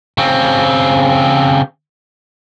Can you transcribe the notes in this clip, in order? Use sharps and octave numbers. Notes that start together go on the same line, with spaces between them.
C#3 C4